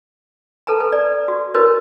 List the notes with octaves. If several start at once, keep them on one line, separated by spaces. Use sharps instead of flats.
A4 B4 A5 A#5
B4
D5
F#4
E4 F#4 A#4 B4 C#5